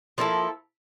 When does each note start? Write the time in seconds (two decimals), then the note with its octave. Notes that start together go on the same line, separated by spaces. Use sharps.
0.18 F3 A#3 E4 A4